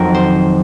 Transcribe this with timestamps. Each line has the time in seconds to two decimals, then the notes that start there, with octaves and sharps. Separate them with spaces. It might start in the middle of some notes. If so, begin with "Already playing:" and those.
Already playing: F2 D#3 F#3 C4 A#4
0.14 C5